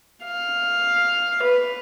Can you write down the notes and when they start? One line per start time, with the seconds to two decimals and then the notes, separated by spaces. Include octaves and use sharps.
0.24 F5
1.43 B4